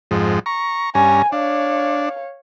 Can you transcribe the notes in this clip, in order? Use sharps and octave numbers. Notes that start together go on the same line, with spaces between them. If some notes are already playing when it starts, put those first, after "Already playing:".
F2 G#2
A#5 C#6
G2 C#4 G#5 A#5
D4 C#5 F5